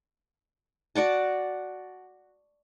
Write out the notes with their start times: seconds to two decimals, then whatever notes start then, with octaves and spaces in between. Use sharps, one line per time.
0.95 F#4 D5 F#5 A5